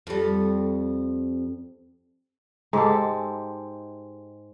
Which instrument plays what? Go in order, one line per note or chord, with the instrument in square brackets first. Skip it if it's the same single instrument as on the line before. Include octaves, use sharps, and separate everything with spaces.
[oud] F2 G3
[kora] G#2 G#3 G4 A4